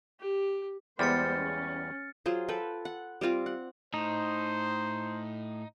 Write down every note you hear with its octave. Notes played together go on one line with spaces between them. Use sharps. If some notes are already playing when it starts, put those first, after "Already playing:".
G4
E2 G3 G#3 B3 C5 F6 A6 C#7
C#4
F#3 F4 G#4 C5
A4 B4 G5
F#5
G3 C4 F4 D6
F#5
A2 D#4 C5